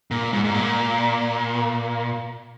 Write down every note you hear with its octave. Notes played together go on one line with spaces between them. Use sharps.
A#2
G#2
G#2
A#2